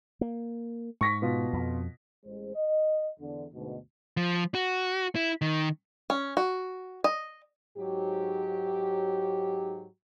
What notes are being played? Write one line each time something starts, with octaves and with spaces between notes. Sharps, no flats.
A#3
G#2 C#6 A#6 B6
B2 F4
F2
A1 G#3 G#4 C5
D#5
E2 D3
D2 G#2 B2
F3
F#4
E4
D#3
C#4
F#4
D#5
G#2 F#3 G4